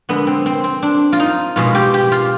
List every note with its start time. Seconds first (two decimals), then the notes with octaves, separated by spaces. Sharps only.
0.09 D3 G#3 B3
0.27 C4
0.46 C4
0.64 C4
0.83 D4
1.13 F4
1.20 D#4
1.56 B2 G#3 F4
1.75 G4
1.94 G4
2.12 F4